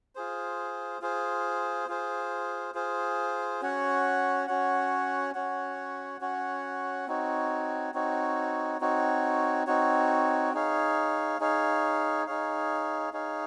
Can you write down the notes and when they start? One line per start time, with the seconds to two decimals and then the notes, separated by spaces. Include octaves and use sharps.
0.15 F4 G#4 C5
1.01 F4 G#4 C5
1.88 F4 G#4 C5
2.74 F4 G#4 C5
3.61 C#4 F#4 C#5 F#5
4.47 C#4 F#4 C#5 F#5
5.35 C#4 F#4 C#5 F#5
6.21 C#4 F#4 C#5 F#5
7.07 C4 D#4 F#4 C#5
7.94 C4 D#4 F#4 C#5
8.80 C4 D#4 F#4 C#5
9.67 C4 D#4 F#4 C#5
10.54 D#4 G#4 C#5 F5
11.40 D#4 G#4 C#5 F5
12.26 D#4 G#4 C#5 F5
13.13 D#4 G#4 C#5 F5